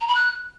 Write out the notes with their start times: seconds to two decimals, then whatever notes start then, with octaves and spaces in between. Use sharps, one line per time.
0.01 A#5
0.08 B5
0.15 F#6